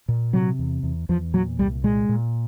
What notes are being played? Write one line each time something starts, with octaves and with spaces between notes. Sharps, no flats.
A#2
C3 F#3
E2
E2
E2 F3
A#2 F#3
C2 G3
A#2 G#3
A#2